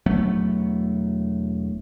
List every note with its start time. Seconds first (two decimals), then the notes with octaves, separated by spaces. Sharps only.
0.06 E1 F#3 A3 B3